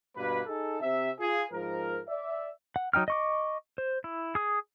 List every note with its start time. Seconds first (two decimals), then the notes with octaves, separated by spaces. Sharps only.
0.16 G2 B2 A#3 B4
0.47 D#4 G#4 A4
0.81 C3 E5
1.20 F4 G#4
1.52 G#2 F3 A#4
2.08 D5 E5
2.76 F#5
2.93 F#3 D#4 G5 F6
3.08 D#5 C#6 D6
3.78 C5
4.04 E4
4.35 G#4 D#6